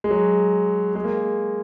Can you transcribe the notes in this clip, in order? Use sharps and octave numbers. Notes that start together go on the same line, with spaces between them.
G#3
F#3
G#3
A#3